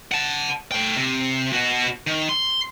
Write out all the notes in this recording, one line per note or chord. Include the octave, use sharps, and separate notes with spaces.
F#5 A5
A3 G5
C3
B2 F#4
D#3
C6